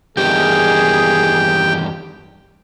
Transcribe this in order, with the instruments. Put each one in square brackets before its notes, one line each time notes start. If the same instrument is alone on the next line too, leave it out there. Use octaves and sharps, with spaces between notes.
[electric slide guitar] E2 G2 D#3 [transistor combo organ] G4 [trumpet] G#4